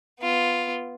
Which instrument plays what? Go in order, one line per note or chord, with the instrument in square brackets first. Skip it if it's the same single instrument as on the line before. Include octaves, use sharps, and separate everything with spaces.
[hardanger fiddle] B3 F4